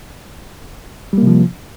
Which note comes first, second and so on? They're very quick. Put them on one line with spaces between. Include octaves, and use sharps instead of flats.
G3 A#3 C3 F3